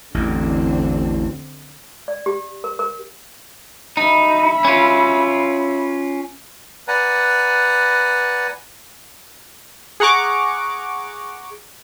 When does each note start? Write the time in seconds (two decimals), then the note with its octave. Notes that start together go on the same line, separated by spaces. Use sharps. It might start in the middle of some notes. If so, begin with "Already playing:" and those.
0.14 A1 E2 D3 C4
2.08 D5
2.26 G4
2.64 A#4
2.79 A#4
3.97 D#4 E5 B5
4.65 C#4 F4
6.88 B4 D5 F#5 G#5 A#5
10.00 G#4 F#5 A#5 C#6 D6